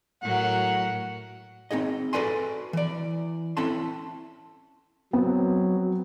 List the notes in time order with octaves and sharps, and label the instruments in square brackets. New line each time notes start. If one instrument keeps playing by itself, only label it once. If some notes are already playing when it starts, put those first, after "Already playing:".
[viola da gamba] A2 F#3 A#4 [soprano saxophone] F#5
[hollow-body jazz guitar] C4 D#4 G#4 D#5
F#4 A4 B4 D5 G#5 C6
E3 D5
C4 C#4 E4 A4 A5 C6
[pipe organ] F#3 [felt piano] B3 C4